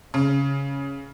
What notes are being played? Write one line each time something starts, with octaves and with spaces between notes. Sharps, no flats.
C#3